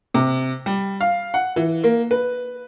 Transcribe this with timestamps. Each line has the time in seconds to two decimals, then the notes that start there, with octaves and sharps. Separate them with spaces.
0.14 C3
0.66 G3
1.01 F5
1.34 F#5
1.56 E3
1.84 A#3
2.11 B4